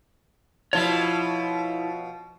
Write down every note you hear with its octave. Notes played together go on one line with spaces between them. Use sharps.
B2 F3 E4 F4 C#5